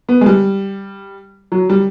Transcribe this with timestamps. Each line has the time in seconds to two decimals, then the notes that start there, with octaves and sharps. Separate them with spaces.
0.09 B3
0.21 G#3
0.26 G3
1.52 F#3
1.70 G3